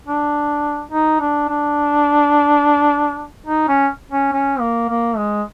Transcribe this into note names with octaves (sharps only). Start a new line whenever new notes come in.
D4
D#4
D4
D4
D#4
C#4
C#4
C#4
A#3
A#3
G#3